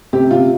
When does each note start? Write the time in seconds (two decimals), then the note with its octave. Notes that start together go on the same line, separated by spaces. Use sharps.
0.13 C3 G4
0.31 C3 F4